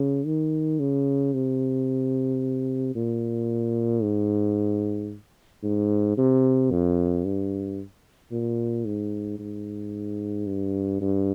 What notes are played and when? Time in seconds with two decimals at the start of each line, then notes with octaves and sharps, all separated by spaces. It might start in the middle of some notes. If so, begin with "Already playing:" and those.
Already playing: C#3
0.26 D#3
0.80 C#3
1.33 C3
2.95 A#2
4.03 G#2
5.63 G#2
6.18 C3
6.71 F2
7.25 G2
8.31 A#2
8.86 G#2
9.39 G#2
10.47 G2
11.01 G2